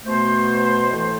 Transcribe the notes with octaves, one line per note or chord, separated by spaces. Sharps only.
B2 A3 C5
A2 E3 A3